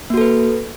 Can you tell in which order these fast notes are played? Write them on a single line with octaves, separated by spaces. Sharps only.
A#3 F#4 A4 B4